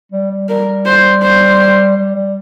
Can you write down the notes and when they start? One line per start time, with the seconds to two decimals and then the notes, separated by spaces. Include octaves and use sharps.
0.12 G3
0.30 G3
0.49 G3 A#4
0.86 C5
1.22 C5
1.96 G3
2.15 G3